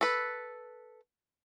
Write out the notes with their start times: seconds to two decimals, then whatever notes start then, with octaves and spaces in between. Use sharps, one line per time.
0.01 A4 B4